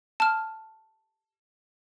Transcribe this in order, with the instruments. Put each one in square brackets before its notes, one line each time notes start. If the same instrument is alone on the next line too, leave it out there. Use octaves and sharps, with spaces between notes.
[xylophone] A5 F6